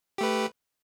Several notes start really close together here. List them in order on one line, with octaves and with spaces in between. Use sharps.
G4 A3 B4